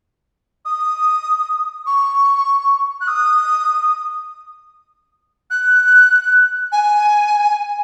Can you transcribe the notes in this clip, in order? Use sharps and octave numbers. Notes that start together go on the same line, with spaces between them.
D#6
C#6
F#6
D#6
F#6
G#5